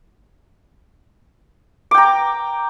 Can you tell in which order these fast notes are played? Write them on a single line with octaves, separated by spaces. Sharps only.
D6 G5 A#5